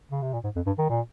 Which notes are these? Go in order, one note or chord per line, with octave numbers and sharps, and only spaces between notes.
C#3
C3
A#2
G#2
F2
G2
D#3
A#2